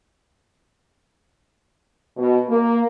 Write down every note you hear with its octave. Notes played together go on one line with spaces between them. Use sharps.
B2
A#3